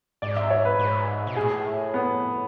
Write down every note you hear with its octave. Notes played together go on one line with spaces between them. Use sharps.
G#2 D5
E5
C#5
B4
G#2
B2
A2 G#4
B3